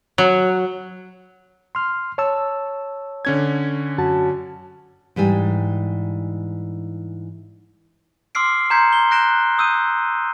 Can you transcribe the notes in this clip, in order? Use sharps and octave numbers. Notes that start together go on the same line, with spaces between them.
F#3
C6 F6
C#5 A5 E6
D3 C#4 G#6
F#2 F#4 A5
G#2 E3 G3 G#5
C6 D6 E6 F6 C7 D7
A#5 C6 G6 G#6 B6 C#7
C6 G7
F#6 G6 A#6 D7 E7 G7
D#6 E6 G6 D#7